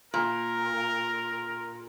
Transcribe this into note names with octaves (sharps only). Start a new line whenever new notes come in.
A#2 A#4